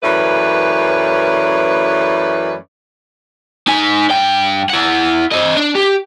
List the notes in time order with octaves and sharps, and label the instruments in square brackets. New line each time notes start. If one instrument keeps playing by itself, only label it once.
[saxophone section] F#2 E3 A3 C#4 B4 D5
[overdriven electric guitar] D#4 G#5
G2 G5
E4 F#5
C4 D#5
D4
G4